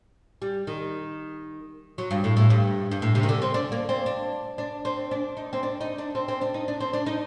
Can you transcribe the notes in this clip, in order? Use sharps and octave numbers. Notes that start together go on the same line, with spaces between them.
G3
D#3
F#3
G2
A2
A2
G2
G2
A2
C3
D#3
D3
C4
D4
A#3
C4
D4
D4
C4
D4
D#4
C4
D4
D#4
D4
C4
C4
D4
D#4
D4
C4
D4
D#4